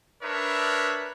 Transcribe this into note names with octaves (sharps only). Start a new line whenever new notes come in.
D4 A#4 B4 C#5 E5